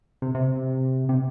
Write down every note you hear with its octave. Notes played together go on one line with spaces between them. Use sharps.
C3
C3
C3